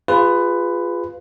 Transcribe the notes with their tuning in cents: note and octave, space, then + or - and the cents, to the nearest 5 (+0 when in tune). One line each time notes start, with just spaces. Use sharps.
F4 +0 G#4 -25 B4 +15